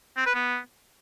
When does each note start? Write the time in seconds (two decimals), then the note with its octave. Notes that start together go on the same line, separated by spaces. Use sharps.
0.17 C4
0.26 B4
0.34 B3